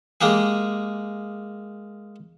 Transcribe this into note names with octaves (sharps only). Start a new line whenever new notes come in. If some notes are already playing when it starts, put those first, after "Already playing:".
G#3 A#3 G4 G#4